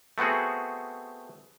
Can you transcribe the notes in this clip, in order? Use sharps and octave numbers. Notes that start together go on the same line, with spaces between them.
A3 B3 C4 F#4 G#4